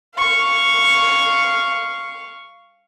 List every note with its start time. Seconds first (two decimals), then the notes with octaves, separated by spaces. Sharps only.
0.15 F5 C#6